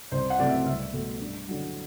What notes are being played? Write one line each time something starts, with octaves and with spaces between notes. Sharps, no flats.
C2 C5
F#5
C3 F#3 A3 D5
E5
C2 E5
B2 A3
G2
D3 F#3